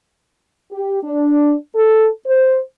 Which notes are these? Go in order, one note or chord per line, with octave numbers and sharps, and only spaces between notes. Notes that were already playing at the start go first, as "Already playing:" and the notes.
G4
D4
A4
C5